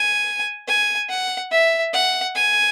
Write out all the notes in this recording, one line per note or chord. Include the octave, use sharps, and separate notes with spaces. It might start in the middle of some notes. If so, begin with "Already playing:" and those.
Already playing: G#5
G#5
F#5
E5
F#5
G#5